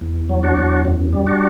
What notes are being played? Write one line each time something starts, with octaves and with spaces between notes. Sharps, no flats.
E2
F#3
D4 F#4
E2
F#2
G3
D4 F#4